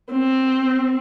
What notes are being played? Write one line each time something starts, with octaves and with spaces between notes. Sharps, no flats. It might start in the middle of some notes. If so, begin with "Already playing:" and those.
C4